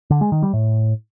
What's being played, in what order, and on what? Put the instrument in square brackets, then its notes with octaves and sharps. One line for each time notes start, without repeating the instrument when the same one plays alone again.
[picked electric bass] D3
G#3
D#3
G3
A2